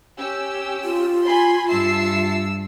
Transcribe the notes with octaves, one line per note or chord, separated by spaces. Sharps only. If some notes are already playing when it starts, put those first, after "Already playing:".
C#4 G4 E6
F4
G#5 B5 C6
G2 E5 A5 E6 C7